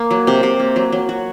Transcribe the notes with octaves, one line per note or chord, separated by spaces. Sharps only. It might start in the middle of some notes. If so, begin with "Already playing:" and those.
Already playing: A#3
F#3
C3
C3
A#3
F#3
F#3
F#4